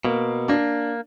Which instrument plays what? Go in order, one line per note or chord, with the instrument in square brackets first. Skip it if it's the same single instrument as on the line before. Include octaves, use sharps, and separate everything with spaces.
[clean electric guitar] B2 [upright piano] A#3
[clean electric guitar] A#3 [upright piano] D4